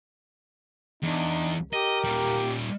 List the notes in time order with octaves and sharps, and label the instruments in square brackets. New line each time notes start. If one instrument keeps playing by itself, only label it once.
[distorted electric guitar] E2 [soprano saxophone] D4 [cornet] D#4
[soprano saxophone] G4 [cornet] A#4 [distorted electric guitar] D#5
[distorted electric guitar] A#2 G3